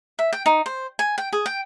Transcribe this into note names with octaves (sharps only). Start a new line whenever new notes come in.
E5
G5
D#4
C5
G#5
G5
G#4
G5